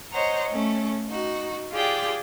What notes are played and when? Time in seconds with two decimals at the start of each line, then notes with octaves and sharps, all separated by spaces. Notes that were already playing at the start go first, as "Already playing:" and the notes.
0.11 C5 C#5 D#5 F#5 A#5
0.50 A3 C#4
1.08 D#4 F#4
1.71 F4 G4 G#4 D5 G5